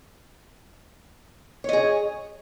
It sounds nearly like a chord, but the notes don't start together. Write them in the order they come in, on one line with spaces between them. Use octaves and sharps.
C#5 D#5 G#4